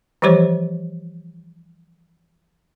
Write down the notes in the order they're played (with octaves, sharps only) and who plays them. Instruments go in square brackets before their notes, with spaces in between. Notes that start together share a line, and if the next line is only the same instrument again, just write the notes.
[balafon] E3 F3 G3 G4 C5 C#5